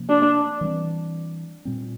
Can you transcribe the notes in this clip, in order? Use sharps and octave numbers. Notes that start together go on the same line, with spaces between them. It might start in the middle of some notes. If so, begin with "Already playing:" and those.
Already playing: C3 F3 A#3 C#4
D4
E3 G3 C4
A#2 G3 C4